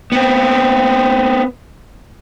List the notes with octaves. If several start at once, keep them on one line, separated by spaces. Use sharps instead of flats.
B3 C4